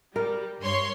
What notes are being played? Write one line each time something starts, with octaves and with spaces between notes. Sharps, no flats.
G3 A#4
G2 C#5 C6